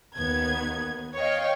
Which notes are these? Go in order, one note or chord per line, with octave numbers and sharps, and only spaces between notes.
D#2 D#3 B3 G#6
C#5 D#5 F5 G5